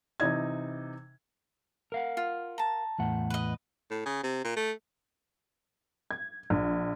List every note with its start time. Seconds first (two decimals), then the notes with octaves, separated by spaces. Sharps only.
0.20 C3 E3 D#4 G#6
1.92 A#4 F5 F#5
2.17 F4
2.58 A5 A#5
2.99 E2 A2 F#5
3.30 B4 D#5
3.91 A2
4.06 C#3
4.23 C3
4.44 A#2
4.56 A3
6.11 G#6
6.50 A#1